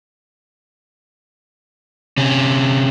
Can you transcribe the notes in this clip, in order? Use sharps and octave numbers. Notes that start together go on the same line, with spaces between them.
C3 C#4